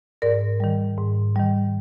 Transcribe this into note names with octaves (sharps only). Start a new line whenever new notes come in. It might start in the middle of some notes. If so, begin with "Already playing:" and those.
G#2 A#4 D5
D#3 G3
G#2
D#3 G3